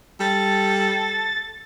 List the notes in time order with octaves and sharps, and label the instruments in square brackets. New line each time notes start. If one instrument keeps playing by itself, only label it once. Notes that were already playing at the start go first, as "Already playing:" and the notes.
[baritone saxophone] G3 [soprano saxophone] A4 [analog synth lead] A6